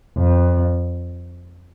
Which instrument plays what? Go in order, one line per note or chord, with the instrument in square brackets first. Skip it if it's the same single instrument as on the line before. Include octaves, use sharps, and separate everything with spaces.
[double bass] F2